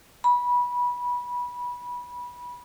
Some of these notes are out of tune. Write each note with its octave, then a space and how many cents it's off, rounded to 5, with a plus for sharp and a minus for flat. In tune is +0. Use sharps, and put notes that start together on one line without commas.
B5 -20